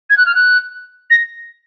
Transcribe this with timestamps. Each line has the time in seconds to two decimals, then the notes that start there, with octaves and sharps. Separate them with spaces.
0.10 G#6
0.17 F#6
0.26 F6
0.35 F#6
1.10 A#6